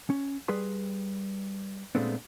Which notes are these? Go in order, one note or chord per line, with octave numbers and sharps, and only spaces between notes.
C#4
G3 G#4 B4 C6
A#2 G#3 A3 B3 C4 D4